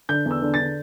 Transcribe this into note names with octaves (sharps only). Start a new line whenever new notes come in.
D3 G6
E2
E6
D3
A6
D3